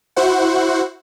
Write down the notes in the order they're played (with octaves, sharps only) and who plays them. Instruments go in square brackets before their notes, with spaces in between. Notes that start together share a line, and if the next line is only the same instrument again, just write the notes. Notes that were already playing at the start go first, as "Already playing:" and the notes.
[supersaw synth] E4 F#4 C5 F#5